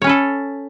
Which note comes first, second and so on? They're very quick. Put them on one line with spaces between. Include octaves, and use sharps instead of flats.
C#5 C#4 B4 A4